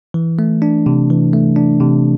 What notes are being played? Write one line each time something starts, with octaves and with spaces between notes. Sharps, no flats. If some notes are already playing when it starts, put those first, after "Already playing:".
E3
A3
D4
C3
E3
A3
D4
C3